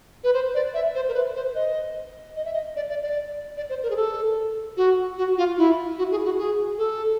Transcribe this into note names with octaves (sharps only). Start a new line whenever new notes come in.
B4
C5
D5
E5
C5
A#4
B4
C5
D#5
D#5
E5
D#5
D5
D5
D5
D5
C5
A#4
G#4
A4
F#4
F#4
F4
E4
F#4
G#4
F#4
G#4
A4